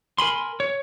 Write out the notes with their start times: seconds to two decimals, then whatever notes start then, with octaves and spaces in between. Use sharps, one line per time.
0.18 A#4 G#5 B5 C6
0.60 C#5